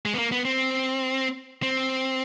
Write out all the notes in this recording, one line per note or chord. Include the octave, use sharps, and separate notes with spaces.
G#3
B3
A#3
B3
C4
C4